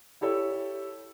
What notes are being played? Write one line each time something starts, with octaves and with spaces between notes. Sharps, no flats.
E4 G4 A4 C#5